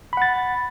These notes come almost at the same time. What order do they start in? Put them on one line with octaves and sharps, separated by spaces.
B5 F#5 A6